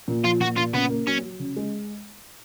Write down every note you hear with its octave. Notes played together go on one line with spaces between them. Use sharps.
A#2
F3 F4
A#2 F#4
A#2 F4
C#3 B3
A#3
F#3 C#4
F#3
C#3
G#3